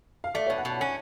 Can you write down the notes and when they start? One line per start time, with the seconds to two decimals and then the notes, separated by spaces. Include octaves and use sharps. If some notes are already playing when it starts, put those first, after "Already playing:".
0.24 F5
0.34 A3 D5
0.47 C#5
0.50 B2
0.58 F#5
0.65 B2 A5
0.80 C#4 F#5